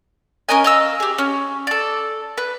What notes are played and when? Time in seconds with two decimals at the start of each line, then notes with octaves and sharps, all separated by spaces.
0.49 C#4 A#4 D#5 G#5
0.64 D#5 F5 E6
1.00 G4 G#4
1.18 C#4
1.67 A4 D5
2.38 B4